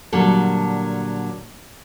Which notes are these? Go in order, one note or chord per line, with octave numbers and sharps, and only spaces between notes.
A#2 D3 F#3 G3 A4